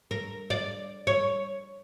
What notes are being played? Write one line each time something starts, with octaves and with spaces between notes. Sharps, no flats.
A#4
D5
C#5